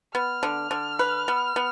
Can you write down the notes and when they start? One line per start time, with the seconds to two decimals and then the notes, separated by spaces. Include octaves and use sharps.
0.14 B3 F6
0.43 D3
0.71 D3
0.99 B4
1.28 B3
1.56 B3